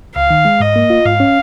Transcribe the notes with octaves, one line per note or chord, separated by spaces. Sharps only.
C#2 F5
D#3
G#3
G#2 D#5
A#3
F4
G#2 F5
C#4